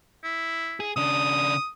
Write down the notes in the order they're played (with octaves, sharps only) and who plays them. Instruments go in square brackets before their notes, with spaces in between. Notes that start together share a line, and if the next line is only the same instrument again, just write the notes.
[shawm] E4
[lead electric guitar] G#4
[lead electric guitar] C#3 D4 [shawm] D#6